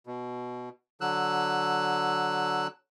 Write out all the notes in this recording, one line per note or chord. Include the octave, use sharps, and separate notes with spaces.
B2
D3 F#3 E6 F#6